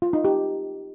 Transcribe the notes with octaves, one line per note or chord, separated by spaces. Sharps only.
F4
D#4
G4